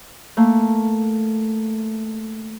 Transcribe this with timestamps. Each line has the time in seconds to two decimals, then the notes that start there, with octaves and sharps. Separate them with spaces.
0.37 A3 A#3